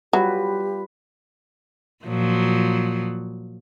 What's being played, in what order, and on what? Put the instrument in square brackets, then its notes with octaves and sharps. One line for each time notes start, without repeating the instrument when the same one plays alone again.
[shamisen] F#3 [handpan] G3 F4 B4 [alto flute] G4
[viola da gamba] A#2 F3 F#3